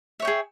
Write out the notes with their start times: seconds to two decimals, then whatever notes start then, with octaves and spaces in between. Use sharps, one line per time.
0.20 E5
0.22 C#5
0.25 G5
0.27 G#4